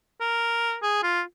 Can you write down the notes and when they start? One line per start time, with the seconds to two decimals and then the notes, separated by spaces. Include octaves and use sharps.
0.21 A#4
0.82 G#4
1.03 F4